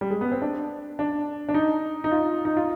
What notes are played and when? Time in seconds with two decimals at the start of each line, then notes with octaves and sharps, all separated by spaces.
0.01 G3
0.10 G#3
0.21 B3
0.32 C4
0.42 D4
0.99 D4
1.49 D4
1.54 D#4
2.04 D#4
2.11 F4
2.45 D#4
2.57 F4